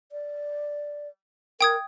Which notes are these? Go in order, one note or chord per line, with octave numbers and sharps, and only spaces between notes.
D5
A#4 G5 D#6 G#6